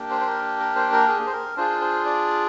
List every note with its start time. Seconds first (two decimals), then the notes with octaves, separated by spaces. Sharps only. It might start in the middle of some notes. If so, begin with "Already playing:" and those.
Already playing: A#3 D4 G4
0.11 C5
0.21 C5
0.27 A#4
0.60 A#4
0.76 C5
0.92 A#4
1.08 G#4
1.27 C5
1.32 A#4
1.57 D4 F4 G#4 C5
1.81 C5
2.06 D5